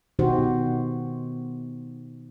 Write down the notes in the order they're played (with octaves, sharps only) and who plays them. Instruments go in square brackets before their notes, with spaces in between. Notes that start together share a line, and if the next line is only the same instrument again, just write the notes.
[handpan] B2 D#3 D#4 F#4 G4 C5